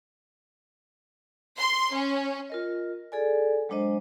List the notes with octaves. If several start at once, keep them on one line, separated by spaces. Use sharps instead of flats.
C6
C#4
F4 A#4 D#5
G#4 A4 D5 G#5
F#3 G#3 D4 C5 D#5